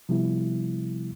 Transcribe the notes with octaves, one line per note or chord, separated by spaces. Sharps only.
C3 F3 G3 B3 E4